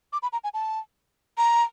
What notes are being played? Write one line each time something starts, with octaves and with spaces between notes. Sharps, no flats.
D6
B5
A#5
G#5
A5
A#5